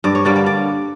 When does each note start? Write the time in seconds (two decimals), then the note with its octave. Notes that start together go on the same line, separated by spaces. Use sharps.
0.04 G2 D5
0.15 C#5
0.25 D3 G3 A#3 D5
0.36 D5
0.46 D5